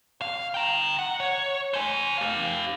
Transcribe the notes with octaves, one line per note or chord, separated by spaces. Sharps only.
F5
G5 A#5
F#5
C#5
C5 G#5
G4 F5